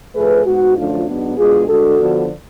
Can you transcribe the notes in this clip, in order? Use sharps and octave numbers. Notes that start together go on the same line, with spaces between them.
A2 F3 A3 G#4 B4
G#2 G#3 B3 F#4
F#2 D3 F3 A3 D4 F4
G#2 F#3 B3 D4
B2 G#3 D4 F4 G#4
D3 G#3 D4 F#4 A4
D3 F3 B3 D4